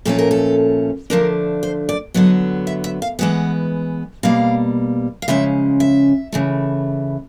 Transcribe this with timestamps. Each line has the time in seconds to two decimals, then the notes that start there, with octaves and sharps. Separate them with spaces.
0.05 A#2 F3 A3 C#4 A4
0.19 A#4
0.31 A4
1.10 D3 F3 A3 D4 A#4
1.63 C5
1.89 D5
2.14 D3 F#3 B3 D#5
2.67 E5
2.84 E5
3.02 F5
3.19 E3 G#3 B3 F#5
4.23 B2 G3 A#3 F5
5.22 F5
5.28 C#3 F3 G#3 C#4 E5
5.80 E5
6.32 C#3 E3 A3